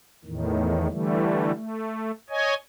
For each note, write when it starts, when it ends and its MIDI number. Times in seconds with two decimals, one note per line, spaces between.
0.25 0.88 40
0.25 0.88 45
0.25 0.88 51
0.90 1.52 50
0.90 1.52 52
0.90 1.52 55
0.90 1.52 57
1.53 2.11 57
2.30 2.54 73
2.30 2.54 75
2.30 2.54 80